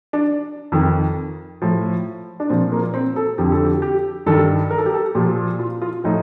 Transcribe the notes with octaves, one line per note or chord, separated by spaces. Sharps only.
D4
F2 D#3
A2 F3
D4
A#2 F3 C4
A#3
C4
A4
F2 D3 F3 G4
A4
G4
G4
G2 D#3 A4
A#4
A4
G4
A4
A#2 F3 G4
F4
F4
A2 F3 D#4